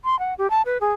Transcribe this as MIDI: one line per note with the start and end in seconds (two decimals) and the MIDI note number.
0.05 0.18 84
0.19 0.34 78
0.38 0.50 67
0.50 0.62 81
0.66 0.78 71
0.81 0.92 68